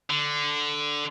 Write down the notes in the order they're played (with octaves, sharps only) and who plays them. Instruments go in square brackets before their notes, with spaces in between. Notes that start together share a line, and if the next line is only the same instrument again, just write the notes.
[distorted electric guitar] D3